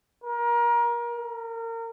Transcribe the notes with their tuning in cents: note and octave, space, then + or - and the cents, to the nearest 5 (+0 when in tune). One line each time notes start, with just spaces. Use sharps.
A#4 +30
A#4 -30